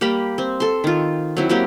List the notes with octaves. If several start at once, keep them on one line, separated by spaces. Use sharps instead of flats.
G3 A#3 G4 B5
C4
A4 C6
D#3 F4
F#3 C4 E4
F#3 A#3 C4 G4